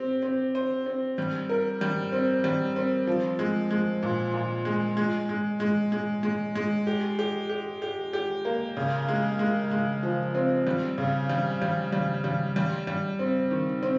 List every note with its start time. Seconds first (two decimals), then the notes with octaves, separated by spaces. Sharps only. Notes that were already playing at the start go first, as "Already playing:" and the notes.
Already playing: C4 G4
0.22 C4
0.55 C5
0.86 C4
1.18 G3
1.49 A#4
1.81 G3
2.12 C4
2.44 G3
2.76 C4
3.07 F3
3.39 G#3
3.71 G#3
4.03 A#2
4.34 A#2
4.65 G#3
4.97 G#3
5.29 G#3
5.60 G#3
5.92 G#3
6.23 G#3
6.55 G#3
6.87 G4
7.19 G4
7.49 G4
7.82 G4
8.13 G4
8.45 A#3
8.77 C#3
9.08 G#3
9.39 G#3
9.71 G#3
10.03 F3
10.35 C4
10.67 G3
10.98 C#3
11.29 G3
11.62 G3
11.93 G3
12.24 G3
12.56 G3
12.87 G3
13.19 C4
13.51 D#3
13.83 C4